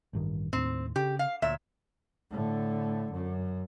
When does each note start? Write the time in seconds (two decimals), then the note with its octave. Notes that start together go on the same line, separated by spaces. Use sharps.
0.13 A1 G2 D#3
0.53 D#2 A2 C4
0.96 C#3 G4
1.19 F5
1.42 D2 A#2 C#5 E5
2.31 A2 D3
3.12 F#2